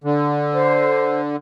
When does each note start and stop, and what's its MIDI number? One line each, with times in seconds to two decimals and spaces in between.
0.04 1.36 50
0.54 1.21 72